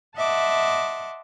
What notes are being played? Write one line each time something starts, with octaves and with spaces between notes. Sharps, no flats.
D#5 E5 F#5 A5 C6 D6